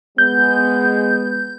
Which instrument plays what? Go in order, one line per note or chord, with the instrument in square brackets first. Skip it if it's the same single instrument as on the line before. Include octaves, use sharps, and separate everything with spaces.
[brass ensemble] G#3 B3 [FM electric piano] G6